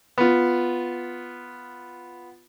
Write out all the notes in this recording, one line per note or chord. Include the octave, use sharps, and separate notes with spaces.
B3 F4